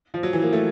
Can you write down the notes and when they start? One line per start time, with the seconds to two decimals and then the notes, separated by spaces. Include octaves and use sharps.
0.14 F3
0.23 F#3
0.33 E3
0.42 A#3
0.53 A3